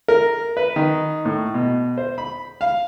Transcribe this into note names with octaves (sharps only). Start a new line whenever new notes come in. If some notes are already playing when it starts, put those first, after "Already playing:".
A#4
B4
D#3
A2
B2
C5
B5
F5